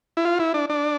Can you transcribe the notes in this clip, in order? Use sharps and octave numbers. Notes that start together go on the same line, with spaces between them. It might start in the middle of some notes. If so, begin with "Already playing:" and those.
E4
F4
E4
D4
D4